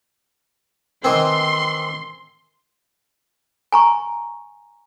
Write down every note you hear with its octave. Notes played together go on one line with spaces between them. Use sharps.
D#3 E3 C4 C6
G#5 A#5 C#6